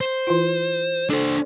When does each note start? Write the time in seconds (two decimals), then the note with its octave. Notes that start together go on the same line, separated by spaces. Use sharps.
0.01 C5
0.27 E3 E4 F4
1.10 D4 A4 C5